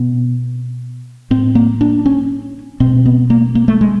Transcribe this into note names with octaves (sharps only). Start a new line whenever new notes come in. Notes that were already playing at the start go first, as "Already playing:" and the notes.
Already playing: B2 B3
A2 C4
A#3
D4
C#4
B2 C4
B3
A#3
A#3
A3
G#3